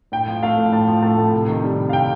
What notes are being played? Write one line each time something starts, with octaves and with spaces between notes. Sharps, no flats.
A2 G5
F3
A3 F5
A2
A2 A5
F3
A3 A5
A2
C3
D#3
G3
C3
F5
C3 G5